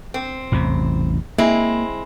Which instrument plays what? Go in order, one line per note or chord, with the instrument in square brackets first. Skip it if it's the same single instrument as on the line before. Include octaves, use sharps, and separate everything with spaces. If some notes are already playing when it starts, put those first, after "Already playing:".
[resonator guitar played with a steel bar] C4
[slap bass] A1 E2 C3
[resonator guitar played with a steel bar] G#3 C4 E4 [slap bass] A#3